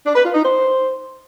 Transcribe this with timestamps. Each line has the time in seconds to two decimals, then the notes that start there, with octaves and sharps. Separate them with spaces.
0.06 D4
0.15 B4
0.25 F4
0.34 D#4
0.44 C5